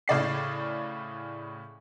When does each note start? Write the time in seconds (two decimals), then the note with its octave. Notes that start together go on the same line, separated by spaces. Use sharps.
0.08 A2 C#3 D5 C7